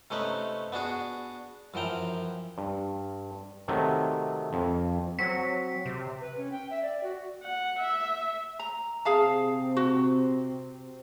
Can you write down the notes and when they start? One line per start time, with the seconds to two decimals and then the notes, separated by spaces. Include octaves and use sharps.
0.10 C3 A3 C#4 D#4 B4
0.72 B3 D4 F#4 G#4
1.74 F#2 E3 F3 G5 A#5
2.58 G2
3.68 C3 D#3 F#3 A3
4.53 F2
5.19 F#3 C4 F#4 B6 C#7
5.86 C3
6.21 B4
6.37 C#4
6.52 G5
6.70 E5
6.83 D5
7.03 F#4
7.43 F#5
7.79 E5
8.59 A#5
9.05 C3 C4 G#4 F5 A5
9.77 F#4